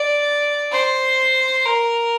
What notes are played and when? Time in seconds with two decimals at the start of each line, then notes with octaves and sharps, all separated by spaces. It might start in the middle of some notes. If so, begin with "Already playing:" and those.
Already playing: D5
0.71 C5
1.65 A#4